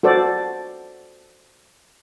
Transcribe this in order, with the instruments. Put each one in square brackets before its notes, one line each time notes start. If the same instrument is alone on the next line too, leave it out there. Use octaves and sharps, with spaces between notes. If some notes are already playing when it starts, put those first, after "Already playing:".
[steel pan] F#4 A4 C5 D5